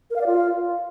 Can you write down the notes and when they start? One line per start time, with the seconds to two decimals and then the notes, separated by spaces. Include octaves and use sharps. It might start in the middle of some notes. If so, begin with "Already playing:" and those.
0.10 A#4
0.16 F5
0.21 D5
0.26 F4